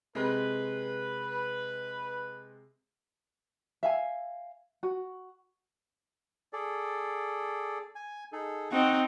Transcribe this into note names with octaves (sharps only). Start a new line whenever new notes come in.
C3 G#3 C4 B4
E5 F5 G#5
F#4
G#4 A4 D5
G#5
D#4 G#4 A4
C4 D#4 F#4 F#5